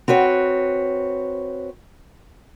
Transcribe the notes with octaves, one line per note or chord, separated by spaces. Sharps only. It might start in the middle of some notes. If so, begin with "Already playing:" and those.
C4 F#4 B4 C#5